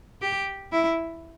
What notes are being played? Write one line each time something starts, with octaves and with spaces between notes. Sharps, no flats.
G4
E4